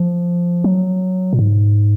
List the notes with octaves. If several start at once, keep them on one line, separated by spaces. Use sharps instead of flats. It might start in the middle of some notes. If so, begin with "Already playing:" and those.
Already playing: F3
F#3
A#2
G#2